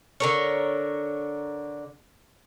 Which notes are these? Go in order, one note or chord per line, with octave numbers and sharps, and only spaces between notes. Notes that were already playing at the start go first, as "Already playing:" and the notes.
D3 A#4 C#5